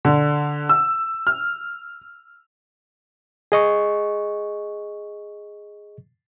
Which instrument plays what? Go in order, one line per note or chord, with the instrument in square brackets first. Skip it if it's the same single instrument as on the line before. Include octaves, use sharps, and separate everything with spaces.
[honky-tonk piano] D3
E6
F6
[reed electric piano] G#4 D#5 C#6